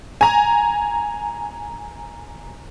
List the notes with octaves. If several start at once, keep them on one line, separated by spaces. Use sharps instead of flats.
G#5 A#5